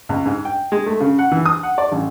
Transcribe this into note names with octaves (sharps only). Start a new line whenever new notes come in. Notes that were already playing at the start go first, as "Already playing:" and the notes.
C#2
G#2
G5
G#3
A3
C#3
F#5
E3
D#6
F#5
D5
A1